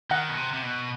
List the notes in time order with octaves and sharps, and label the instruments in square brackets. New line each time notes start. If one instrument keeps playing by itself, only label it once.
[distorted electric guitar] D#3 [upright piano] F#5
[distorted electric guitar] B2
C3
C3
B2